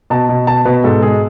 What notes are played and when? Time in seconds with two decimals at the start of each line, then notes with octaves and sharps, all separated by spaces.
0.10 B2 A5
0.29 B2
0.47 B2 A5
0.65 B2 B4
0.84 G#2 A4
1.02 G#3 G#4